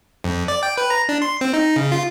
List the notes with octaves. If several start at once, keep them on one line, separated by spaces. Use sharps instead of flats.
F2
D5
G5
B4
A#5
D4
C6
C4
D#4
C#3
F4